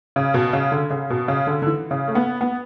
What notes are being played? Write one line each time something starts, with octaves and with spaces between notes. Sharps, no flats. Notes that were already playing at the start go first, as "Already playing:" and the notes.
C#3
B2
C#3
D3
C#3
B2
C#3
D3
D3
E3
C#3
A3
B3
B3